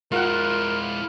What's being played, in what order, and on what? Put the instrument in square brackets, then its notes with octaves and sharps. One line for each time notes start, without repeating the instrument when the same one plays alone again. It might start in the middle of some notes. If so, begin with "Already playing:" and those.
[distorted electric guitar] G#3 E4 [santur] F4 F#5 [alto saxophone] A#4